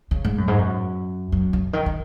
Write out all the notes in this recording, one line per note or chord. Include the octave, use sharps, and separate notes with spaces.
C#3
G#2
F#2
G#2
F#2
F#2
C#3
D#3
D#3